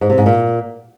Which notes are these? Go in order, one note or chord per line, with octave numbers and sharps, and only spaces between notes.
G#2
C3
G#2
A#2